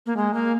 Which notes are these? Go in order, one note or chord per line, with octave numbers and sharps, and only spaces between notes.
A#3
G#3
A#3